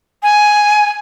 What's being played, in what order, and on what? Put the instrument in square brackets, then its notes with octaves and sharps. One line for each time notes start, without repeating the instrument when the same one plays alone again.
[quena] G#5